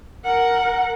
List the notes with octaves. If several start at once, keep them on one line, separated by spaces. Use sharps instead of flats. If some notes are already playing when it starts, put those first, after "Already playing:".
A#4 F#5